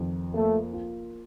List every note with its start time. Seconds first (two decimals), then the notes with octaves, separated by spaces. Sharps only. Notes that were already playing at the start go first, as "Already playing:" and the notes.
Already playing: F2 D#3
0.33 A3 A#3
0.73 F4